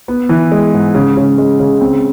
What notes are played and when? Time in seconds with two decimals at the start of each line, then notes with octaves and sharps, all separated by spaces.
0.08 B3
0.29 E3
0.52 G#3
0.73 G#2
0.94 C#3
1.17 C#3
1.38 G#3
1.59 C#3
1.80 C4